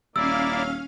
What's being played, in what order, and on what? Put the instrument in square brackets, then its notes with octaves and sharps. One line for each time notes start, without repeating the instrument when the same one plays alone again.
[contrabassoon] D#1 [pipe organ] A#3 E4 D5 [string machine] C#4 F5 F6 [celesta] E6